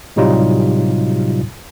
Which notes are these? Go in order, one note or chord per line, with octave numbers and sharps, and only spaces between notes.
A2 C3 F#3 G3 D#4 F4